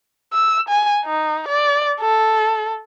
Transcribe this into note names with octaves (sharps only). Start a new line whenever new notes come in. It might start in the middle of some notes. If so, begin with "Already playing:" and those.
E6
G#5
D#4
D5
A4